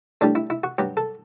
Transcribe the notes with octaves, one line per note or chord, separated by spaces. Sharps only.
A2 G3 D4
E4
E4
F#4
G2 F#3 G4
A4